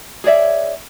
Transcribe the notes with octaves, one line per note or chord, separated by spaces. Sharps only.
G#4 C#5 D5 E5